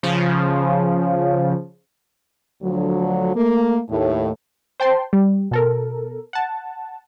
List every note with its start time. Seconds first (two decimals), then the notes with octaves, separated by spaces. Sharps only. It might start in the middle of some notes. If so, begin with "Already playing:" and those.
0.03 C#3 F3
2.63 D2 D3 F3 F#3
3.35 A3 A#3
3.89 D#2 A2
4.80 C5 G5 A5 C6
5.13 G3
5.51 B2 A4 A#4
6.33 F#5 A5